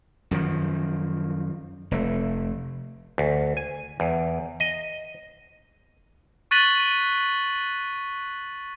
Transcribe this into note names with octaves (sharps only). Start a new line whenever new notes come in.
F#2 D#3 F3
F1 A3
D2
G#5
E2
D#5
C#6 F#6 A6 B6 D#7 F#7